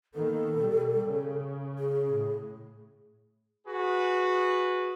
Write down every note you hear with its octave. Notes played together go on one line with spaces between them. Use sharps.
D#3 A#3 B3 A4
B2 G3
C#3
G#4
A2
F#4 G#4 B4